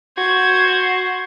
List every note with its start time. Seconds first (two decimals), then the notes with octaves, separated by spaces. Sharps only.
0.18 F#4 C5 G#6